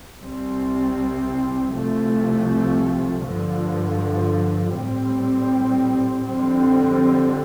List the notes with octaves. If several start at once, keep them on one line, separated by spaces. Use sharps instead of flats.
C2 C3 G3 C4
C2 C3 F3 A3
G2 D3 F3
A2 G3 C4
F2 D3 G3 C4